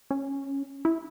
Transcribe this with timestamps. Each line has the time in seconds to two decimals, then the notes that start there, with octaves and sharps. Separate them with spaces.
0.11 C#4
0.85 E4